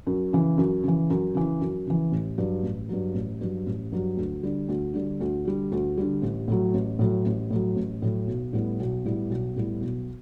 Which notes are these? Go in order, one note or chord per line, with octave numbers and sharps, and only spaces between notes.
F#2
C#3 E3
F#2
C#3 E3
F#2
C#3 E3
F#2
C#3 E3
A1
G2 F#3
A1
G2 F#3
A1
G2 F#3
A1
G2 F#3
D2
D3 G3
D2
D3 G3
D2
D3 G3
D2
D3 G3
A1
A2 F#3
A1
A2 F#3
A1
A2 F#3
A1
A2 F#3
B1
A2 G3 B3 E4
B1
A2 G3 B3 E4
B1
A2 G3 B3 E4
B1